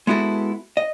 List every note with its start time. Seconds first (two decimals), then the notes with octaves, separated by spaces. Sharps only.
0.07 G#3 B3 E4 F#4 A4
0.77 D#5